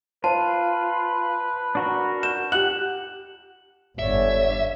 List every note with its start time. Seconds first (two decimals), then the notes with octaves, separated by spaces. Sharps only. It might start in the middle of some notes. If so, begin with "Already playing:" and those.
0.24 F4 B4 C5 A5
1.75 D4 F#4 A#4
2.23 G6 E7
2.52 G4 F#5 F#6 F#7
3.99 G1 D3 C#5 D5 E5